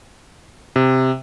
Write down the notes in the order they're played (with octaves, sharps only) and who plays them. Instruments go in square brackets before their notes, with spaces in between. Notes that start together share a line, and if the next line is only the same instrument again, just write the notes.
[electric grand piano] C3